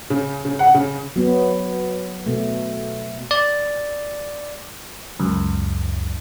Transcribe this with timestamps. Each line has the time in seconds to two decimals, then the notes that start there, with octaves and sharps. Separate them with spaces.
0.10 C#3
0.45 C#3
0.59 F#5
0.74 C#3
1.16 F#3 B3
2.26 B2 A3
3.31 D5
5.19 C#2 F#2